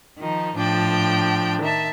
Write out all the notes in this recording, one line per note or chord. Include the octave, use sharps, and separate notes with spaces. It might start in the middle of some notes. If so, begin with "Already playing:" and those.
D#3 F3 D#4
A2 F3 D4 G5
D#3 E5 A5